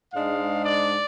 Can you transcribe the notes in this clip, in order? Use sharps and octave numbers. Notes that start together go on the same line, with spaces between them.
G#2 G#3 D4 F5
D5